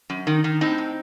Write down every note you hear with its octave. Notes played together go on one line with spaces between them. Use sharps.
F#2
D#3
D#3
A2 C4 D#4
A2